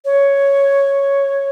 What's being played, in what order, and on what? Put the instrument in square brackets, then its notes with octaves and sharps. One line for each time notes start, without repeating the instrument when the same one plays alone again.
[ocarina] C#5